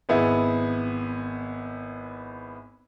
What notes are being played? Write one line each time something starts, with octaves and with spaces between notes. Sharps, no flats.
G#1 B3 E4 G#4